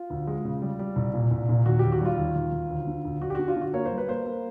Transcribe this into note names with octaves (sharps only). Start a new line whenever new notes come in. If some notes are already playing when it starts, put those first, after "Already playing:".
Already playing: F4
D2
G#3
C#3
G3
G3
C2
A#2
C2
A#2
D#2 F#4
D#2 G4
F#4
G3 F4
D#2
D#2
D#2
D2
D3
D2
D2 F#4
G4
D3 F#4
F4
D3 F#4
A#3 C#5
C5
G3
B4
A#3 C5
A#3